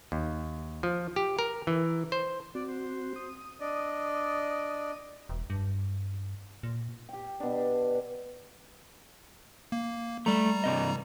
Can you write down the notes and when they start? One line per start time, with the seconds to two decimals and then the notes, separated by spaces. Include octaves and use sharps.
0.12 D#2
0.83 F3
1.16 G4
1.39 A#4
1.67 E3
2.12 C5
2.55 C4 F#4 D5
2.67 C5
3.16 D#6
3.60 D4 D5 D#5
5.29 E1
5.50 G2
6.63 A#2
7.09 G4 G5
7.40 B2 D4
9.72 A#3
10.26 G3 A3 A#5
10.64 G2 C3 D#5